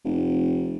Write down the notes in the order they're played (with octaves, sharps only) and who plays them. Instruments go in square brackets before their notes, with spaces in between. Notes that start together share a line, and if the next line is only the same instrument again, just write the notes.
[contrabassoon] F1